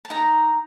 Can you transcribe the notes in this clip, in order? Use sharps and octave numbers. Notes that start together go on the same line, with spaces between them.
A5
D#4 A#5